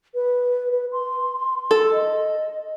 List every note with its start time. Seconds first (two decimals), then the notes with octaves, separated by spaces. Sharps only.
0.15 B4
0.71 B4
0.92 C6
1.71 A4
1.92 D#5